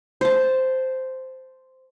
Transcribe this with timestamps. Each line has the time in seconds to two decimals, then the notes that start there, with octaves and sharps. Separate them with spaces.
0.21 C5 A5